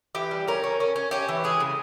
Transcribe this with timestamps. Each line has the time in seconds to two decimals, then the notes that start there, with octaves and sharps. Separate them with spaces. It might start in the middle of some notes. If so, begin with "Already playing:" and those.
0.15 E3 G4
0.31 G3
0.48 C#4 A#4
0.64 C#4
0.80 C#4
0.96 C#4
1.11 C#4 G4
1.28 E3
1.44 G#3 G#4
1.60 C#3